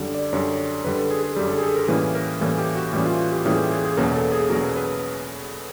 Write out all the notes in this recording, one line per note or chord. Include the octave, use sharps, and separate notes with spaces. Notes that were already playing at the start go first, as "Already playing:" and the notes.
Already playing: F#2 D3 G3
D5
F#2 D3 G3 C#5
F#2 D3 G3 B4
A4
G#4
G#4
F#2 D3 G3 G4
A4
G#4
A4
A#4
A2 E3 G3 A#3 C#4 B4
A#4
A2 E3 G3 A#3 C#4 A4
G4
F#4
A2 E3 G3 A#3 C#4
F4
G4
A2 E3 G3 A#3 C#4 G#4
G4
G#4
G#4
E2 B2 F#3 A#3 C#4 A#4
A4
G#4
E2 B2 F#3 A#3 C#4 A#4
B4
B4